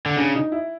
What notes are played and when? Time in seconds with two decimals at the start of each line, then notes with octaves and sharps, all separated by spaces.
0.06 D3
0.18 C#3 D4
0.35 D#4
0.52 E4